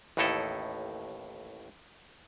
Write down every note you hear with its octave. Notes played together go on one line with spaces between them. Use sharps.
A1 D#2 A2 D#4 E4 A4